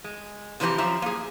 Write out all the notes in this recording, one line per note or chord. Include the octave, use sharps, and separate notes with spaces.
G#3
C3 E3 F3 D4 G4 A#5
F#2 F3 E5 A#5
A#3 G#4